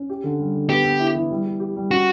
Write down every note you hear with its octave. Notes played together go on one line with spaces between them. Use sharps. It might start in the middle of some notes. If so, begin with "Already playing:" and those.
Already playing: C#4
G4
D3
G3
D3
B3 G4
B3
E4
E3
G3
G4
G4
G3
C#4 F#4